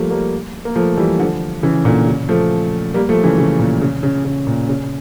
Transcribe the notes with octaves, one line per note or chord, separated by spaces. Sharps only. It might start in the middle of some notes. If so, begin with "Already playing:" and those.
Already playing: F3 G3 A3 A#3
G3 A#3
A#3
F3 A3
E3 G3
D3 F3
C#3 E3
A#2 D3
C#3
F3 A3
G3 A#3
F3 A3
C#3 E3
C#3
A#2
C#3
C#3
C#3
A#2
C#3